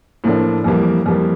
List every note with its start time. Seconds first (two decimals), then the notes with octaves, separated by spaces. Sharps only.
0.24 A2 F3 A#3 D4
0.64 F2 E3 G3 A#3
1.06 F2 E3 G3 A#3